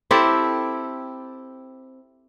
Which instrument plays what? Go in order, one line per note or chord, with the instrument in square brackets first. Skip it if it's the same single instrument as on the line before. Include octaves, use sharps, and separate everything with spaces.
[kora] C4 E4 G4 A4